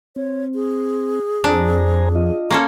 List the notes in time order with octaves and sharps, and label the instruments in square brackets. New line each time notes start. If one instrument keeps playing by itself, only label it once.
[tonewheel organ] C4 [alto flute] C#5
[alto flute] G#4
[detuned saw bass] F2 [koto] D4 [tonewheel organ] C5 G#5 A#5
[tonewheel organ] F4 D#5
[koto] A#3 C#4 A4 [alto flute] C6